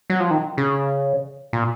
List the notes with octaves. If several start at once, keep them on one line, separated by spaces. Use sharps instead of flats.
F#3
F3
D#3
C#3
A#2